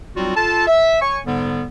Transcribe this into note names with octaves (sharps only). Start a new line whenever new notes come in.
F#3 G3 C4 D#4 F4 F#4
F4 A4 A5
E5
C#5 G#5 C#6
G#2 D3 G3 B3